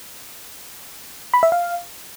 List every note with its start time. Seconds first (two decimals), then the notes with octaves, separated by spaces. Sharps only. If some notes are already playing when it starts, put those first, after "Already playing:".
1.34 B5
1.43 E5
1.52 F5